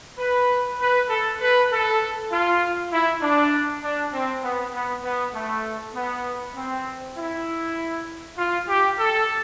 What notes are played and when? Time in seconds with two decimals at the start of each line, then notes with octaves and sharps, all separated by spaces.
0.18 B4
0.79 B4
1.09 A4
1.40 B4
1.70 A4
2.30 F4
2.91 E4
3.21 D4
3.82 D4
4.12 C4
4.43 B3
4.73 B3
5.03 B3
5.34 A3
5.94 B3
6.55 C4
7.15 E4
8.37 F4
8.67 G4
8.97 A4